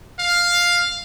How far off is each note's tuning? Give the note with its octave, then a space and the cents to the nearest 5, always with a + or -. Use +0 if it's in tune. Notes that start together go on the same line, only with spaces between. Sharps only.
F5 +5